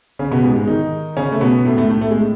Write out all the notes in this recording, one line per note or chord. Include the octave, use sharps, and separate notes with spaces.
C#3 C#4
B2 B3
G#2 G#3
G#2 G#3
D#3 D#4
C#3 C#4
A3
B2 B3
A2 A3
A2 A3
A2 A3
A3
G#3
A2